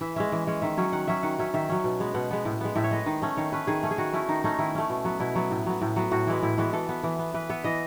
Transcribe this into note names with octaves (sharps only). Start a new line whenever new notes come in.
E3 E5
G#3 C#4 E5
E3
G#3 C#4
D#3 E5
F#3 C#4
D#3 F#5
F#3 C#4 E5
D#3 F#5
F#3 C#4 E5
D#3 E5
F#3 C#4
B2
G#3 B3
B2 F#5
G#3 B3
A2
G#3 B3
A2 E5
C#5
G#3 B3 D#5
D#3
A3 C#4
D#3 C#5
A3 C#4 B4
D#3 G#4
A3 C#4
G#4
D#3 F#4
A3 C#4 E4
D#3 D#4
A3 C#4 D#4
D#3 E4
A3 C#4
B2
F#3 B3
B2 E4
F#3 B3
A2
F#3 B3
A2
F#3 B3
A2 F#4
E3 G#3 B3 E4
A2 E4
E3 G#3 B3 F#4
E3 A4
B3
E3
B3
E3 B4
B3 E5
E3 D#5